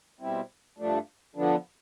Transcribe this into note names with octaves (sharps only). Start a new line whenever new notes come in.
B2 G3 C4 E4
G2 F3 A3 D4
D3 F3 B3 D4